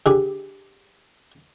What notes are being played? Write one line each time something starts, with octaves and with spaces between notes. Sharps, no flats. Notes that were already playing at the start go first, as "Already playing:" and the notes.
D3 G4 G#4